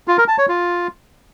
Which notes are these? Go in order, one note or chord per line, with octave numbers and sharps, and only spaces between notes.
F4
A#4
A5
C#5
F4